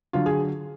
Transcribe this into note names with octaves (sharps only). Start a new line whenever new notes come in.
D3 F#3 F4
G#4